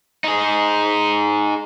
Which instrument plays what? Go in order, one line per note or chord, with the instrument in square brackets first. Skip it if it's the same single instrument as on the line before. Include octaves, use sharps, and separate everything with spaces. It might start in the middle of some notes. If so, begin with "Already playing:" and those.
[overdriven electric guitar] D#4 G#4